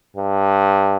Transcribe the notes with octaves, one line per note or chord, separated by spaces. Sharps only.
G2